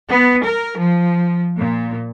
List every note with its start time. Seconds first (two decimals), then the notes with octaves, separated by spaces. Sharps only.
0.11 B3
0.44 A#4
0.76 F3
1.59 A#2